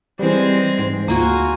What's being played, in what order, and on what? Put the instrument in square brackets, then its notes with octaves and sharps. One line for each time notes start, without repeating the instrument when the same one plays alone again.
[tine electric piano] E3 G3 [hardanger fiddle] G#3 C4
[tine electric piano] G#2
[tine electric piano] D2 [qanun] A#3 F4 F#4 [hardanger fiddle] G#5